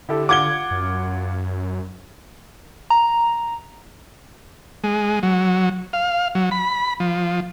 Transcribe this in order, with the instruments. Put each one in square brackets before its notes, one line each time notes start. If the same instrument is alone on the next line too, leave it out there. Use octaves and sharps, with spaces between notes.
[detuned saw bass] D3 [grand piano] E4 G4 A4
[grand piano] F4 F#5 [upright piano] D6 G#6 G7
[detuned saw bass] F#2
[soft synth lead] A#5
[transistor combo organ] G#3
F#3
F5
F#3
B5
F3